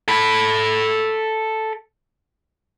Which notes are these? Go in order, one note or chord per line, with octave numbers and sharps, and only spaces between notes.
A4 B5